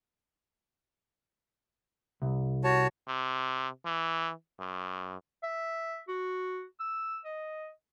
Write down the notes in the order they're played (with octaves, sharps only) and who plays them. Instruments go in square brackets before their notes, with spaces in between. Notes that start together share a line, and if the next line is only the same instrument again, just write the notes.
[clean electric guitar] C2
[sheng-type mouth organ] F#4 C#5 A5
[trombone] C3
E3
F#2
[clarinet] E5
F#4
E6
D#5